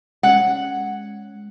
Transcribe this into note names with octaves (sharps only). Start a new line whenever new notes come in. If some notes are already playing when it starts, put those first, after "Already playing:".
G#3 C#4 F#5